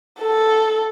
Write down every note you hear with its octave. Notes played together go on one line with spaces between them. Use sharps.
A4